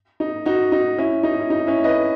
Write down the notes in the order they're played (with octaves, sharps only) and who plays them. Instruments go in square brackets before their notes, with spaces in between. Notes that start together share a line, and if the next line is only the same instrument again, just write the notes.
[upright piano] D#4
D#4 F#4
D#4
C#4 E4
D#4
E4
D#4
C#4 E4
B4 D#5